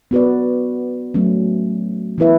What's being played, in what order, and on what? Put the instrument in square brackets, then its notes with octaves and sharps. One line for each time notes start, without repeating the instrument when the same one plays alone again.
[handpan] B3 F#4 B4 D5
F#3 A3 C#4
E3 B3 E4 B4 E5